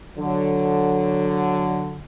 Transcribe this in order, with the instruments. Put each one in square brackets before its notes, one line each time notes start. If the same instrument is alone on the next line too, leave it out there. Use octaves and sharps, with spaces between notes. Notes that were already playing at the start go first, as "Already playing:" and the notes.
[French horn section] D3 F#3